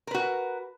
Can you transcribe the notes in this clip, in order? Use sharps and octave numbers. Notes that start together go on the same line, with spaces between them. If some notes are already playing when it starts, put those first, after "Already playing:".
F#4 A#4 B4